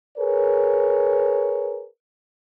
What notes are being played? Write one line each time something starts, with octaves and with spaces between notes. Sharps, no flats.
G#4 A#4 B4 C#5